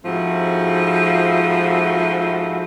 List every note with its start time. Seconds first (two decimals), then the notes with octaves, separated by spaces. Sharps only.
0.05 G#2 F3 A3 C4 E4 F#4